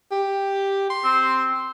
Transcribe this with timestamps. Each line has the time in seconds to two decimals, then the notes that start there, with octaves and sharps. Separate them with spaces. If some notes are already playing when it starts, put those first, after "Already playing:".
0.11 G4
0.90 C6
1.04 C4